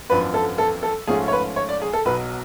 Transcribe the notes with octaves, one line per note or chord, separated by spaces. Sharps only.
G#1 F#2 F3 B3 D4 B4
A4
A4
A4
G#2 F3 A3 C#4 G#4
C#5
B4
C#5
D5
G#4
A4
B1 B2 F#3 B4